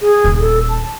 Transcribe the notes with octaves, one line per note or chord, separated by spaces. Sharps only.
G#4
D#1
A4
A5